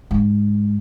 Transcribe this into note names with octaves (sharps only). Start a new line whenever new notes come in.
G#2